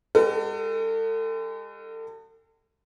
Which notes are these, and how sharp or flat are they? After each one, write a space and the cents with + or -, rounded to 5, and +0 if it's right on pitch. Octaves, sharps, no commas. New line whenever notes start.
G#3 -30 F#4 +40 A4 +35